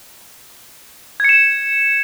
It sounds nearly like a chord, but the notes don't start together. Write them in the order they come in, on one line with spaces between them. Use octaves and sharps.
G#6 C#7 E7